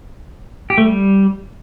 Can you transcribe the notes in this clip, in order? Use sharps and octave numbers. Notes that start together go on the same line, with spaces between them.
G4
A3
G3